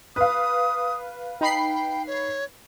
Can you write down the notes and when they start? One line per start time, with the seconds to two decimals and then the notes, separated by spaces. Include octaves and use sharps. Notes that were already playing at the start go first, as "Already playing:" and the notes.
0.16 B4 F5 D#6
1.41 D#4 G5 B5 C7
2.07 C#5